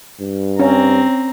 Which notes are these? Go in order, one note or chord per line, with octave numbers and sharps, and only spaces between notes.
G2
C4 C#4 A#5